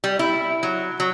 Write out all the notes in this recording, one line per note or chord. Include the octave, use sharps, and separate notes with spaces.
G3
E4
F#3
F#3